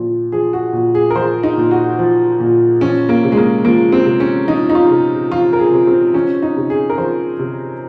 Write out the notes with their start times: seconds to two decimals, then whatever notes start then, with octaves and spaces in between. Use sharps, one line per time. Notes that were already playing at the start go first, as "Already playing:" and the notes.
Already playing: A#2 F3
0.32 F3 G#4
0.53 F#4
0.73 A#2
0.95 G#4
1.10 A#4
1.15 F3 C5
1.43 D#4
1.57 A#2
1.71 F#4
1.99 F3
2.40 A#2
2.81 F3 C#4
3.09 A#3
3.23 C3
3.32 G#3
3.37 A#3
3.65 F3 A#3
3.92 C4
4.06 C3
4.20 C#4
4.48 F3 D#4
4.70 D#4
4.75 F4
4.90 C3
5.31 F3 F4
5.53 A#4
5.59 G#4
5.72 C3
5.87 C4
6.14 F3 C#4
6.42 D#4
6.57 C3
6.70 G#4
6.90 A#4
6.98 F3 C5
7.39 C3